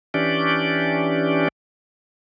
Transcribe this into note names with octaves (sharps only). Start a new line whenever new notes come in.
E3 C#4 D4 G4 D5